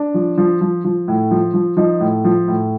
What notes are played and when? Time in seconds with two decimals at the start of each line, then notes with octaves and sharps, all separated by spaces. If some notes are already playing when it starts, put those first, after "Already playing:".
Already playing: D4
0.14 F3
0.38 F3
0.61 F3
0.85 F3
1.08 A2
1.31 F3
1.54 F3
1.77 F3 D#4
2.00 A2
2.24 F3
2.48 A2